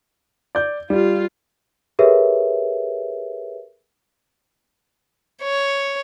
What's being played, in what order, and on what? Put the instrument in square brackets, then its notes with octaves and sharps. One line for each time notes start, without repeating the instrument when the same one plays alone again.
[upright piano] D5 G6
[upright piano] G3 [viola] F4
[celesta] G4 G#4 A#4 B4 C#5 E5
[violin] C#5